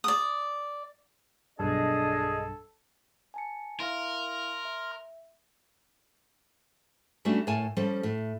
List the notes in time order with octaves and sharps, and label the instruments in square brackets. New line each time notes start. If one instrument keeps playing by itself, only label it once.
[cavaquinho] D5 D#6
[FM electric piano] B1 G2 [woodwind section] D4 G#4 D#5 [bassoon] A4
[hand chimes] G#5 A5 C#7
[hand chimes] E4 E5 F5 [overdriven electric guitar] A#4 [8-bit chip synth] C6 F6
[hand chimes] E5
[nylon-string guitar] G3 A3 C#4 D4 F#4 G4
A2 A#4 C#5 G#5 A5
F3 G3 C#4 G4 A4
A2